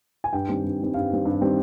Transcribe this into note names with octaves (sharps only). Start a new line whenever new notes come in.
G#5
G2 G5
D#3 G3 C4
G2
D#3 G3 C4
G2 F5
D#3 G3 C4
G2
D#3 G3 C4